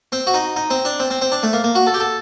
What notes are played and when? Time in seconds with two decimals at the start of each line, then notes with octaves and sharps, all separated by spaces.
0.12 C4
0.27 F#4
0.34 D#4
0.56 D#4
0.70 C4
0.85 D4
1.00 C4
1.10 C4
1.22 C4
1.32 D4
1.43 A3
1.53 A#3
1.64 A#3
1.75 F#4
1.87 A4
1.94 G4
2.00 A4